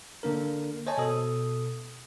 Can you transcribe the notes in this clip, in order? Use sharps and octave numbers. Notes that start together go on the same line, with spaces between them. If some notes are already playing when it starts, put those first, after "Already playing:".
D3 A#3 D4 A#4
C5 C#5 D#5 G#5 A5
B2 A4 D#6